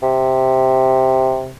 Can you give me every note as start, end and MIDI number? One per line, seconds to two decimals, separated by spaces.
0.03 1.56 48